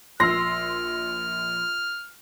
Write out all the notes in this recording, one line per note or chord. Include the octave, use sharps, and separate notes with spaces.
A#1 C6 E6 F6 A#6